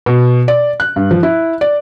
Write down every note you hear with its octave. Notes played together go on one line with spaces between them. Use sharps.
B2
D5
F#6
G2
F3
E4
D5